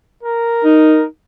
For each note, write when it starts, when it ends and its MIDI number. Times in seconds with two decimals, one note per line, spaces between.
0.23 1.03 70
0.65 1.05 63